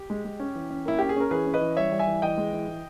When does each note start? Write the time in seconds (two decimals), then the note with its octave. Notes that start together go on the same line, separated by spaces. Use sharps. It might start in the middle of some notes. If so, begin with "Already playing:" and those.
Already playing: G4
0.10 G#3
0.25 G#3
0.40 C#4
0.55 E3
0.70 C#4
0.85 A#3 E4
0.99 C#4 G4
1.09 G#4
1.16 C#4 A#4
1.31 E3 G#4 B4
1.47 C#4
1.54 B4 D#5
1.61 E3
1.77 G3 C#5 E5
1.92 G3
1.99 E5 G#5
2.07 E3
2.22 E3 D#5 G5
2.37 G#3
2.53 E3
2.68 E3